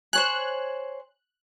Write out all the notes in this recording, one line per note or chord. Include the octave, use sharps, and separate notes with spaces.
C5 C#5 G#5 F#6